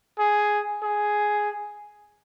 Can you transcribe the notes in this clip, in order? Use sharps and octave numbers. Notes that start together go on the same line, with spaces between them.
G#4
G#4